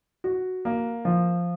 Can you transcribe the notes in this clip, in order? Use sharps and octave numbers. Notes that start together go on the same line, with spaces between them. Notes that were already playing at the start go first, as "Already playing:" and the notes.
F#4
A#3
F3